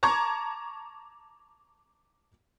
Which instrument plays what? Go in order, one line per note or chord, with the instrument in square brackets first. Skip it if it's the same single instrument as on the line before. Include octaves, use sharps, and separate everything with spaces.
[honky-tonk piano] A5 A#5 C#6 D6 G#6